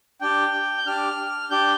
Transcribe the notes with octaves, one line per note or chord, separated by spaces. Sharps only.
D4 G4 G5
G6
D4 G4 F6
D4 G4 G6